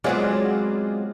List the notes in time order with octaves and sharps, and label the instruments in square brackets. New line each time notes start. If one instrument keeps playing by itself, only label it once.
[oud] F#3 B3 C4 [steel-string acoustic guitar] G#3 [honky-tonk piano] F4 G#4 D5